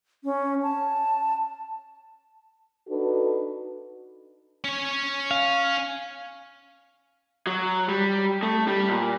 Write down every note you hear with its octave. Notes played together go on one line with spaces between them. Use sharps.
C#4
A5
D4 D#4 F#4 A4 B4
C#4 C#5
F5
F#3
G3
A3
G3
A#2